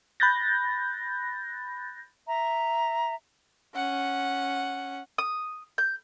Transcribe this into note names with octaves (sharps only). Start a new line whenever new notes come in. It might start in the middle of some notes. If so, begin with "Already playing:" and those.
B5 F#6 G6 A6 A#6
E5 A#5
C#4 F#5
D#6
G6